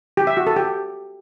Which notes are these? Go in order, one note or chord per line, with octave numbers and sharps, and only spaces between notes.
G4
E5
F#4
A4
G4